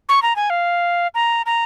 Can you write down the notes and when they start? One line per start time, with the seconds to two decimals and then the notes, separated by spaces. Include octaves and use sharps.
0.09 C#6
0.22 A#5
0.36 G#5
0.50 F5
1.14 A#5
1.46 A#5